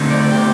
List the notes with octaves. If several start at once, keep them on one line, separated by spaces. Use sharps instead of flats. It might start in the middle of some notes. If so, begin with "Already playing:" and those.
Already playing: D2 D3 A3 C4 D#4
D5
G4